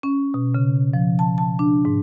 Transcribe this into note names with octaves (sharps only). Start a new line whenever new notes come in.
C#4
B2
C#3
F3
A5
A5
D4
G#2